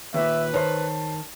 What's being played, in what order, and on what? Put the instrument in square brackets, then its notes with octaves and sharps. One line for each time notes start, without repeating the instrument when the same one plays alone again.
[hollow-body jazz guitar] D#2 A#2 [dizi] B4 [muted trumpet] E5
[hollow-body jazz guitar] D#3 [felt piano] C5 C#5 [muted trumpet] A5